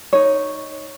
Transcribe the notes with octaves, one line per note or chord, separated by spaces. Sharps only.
D#4 C#5